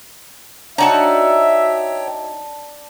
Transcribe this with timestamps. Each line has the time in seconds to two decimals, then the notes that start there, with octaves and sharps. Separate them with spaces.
0.78 D4 D#4 F#4 C#5 E5 G5 A5